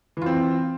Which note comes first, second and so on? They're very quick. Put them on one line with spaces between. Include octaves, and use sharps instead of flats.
E3 F4 C4